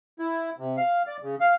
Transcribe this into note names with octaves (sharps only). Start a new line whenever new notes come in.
E4
C3
F5
D5
C#3
F5